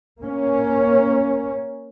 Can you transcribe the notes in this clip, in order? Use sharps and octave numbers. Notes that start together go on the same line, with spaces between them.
A#3 C#4